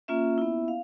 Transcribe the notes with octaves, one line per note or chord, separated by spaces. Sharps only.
A#3 C#4 F4 E5
B3 E4
F5